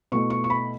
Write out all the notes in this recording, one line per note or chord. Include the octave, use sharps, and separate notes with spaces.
B2 A3 E4 C#6
C#6
C#6
B5